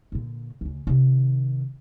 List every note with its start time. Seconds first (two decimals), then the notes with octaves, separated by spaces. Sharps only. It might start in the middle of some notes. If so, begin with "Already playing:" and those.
0.12 A#2 D3
0.61 D2 C#3
0.87 C3 D#3